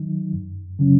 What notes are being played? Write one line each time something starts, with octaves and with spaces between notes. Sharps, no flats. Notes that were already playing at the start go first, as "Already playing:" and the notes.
Already playing: D#3 F#3 D#4
F#2
C#3 F#3 C#4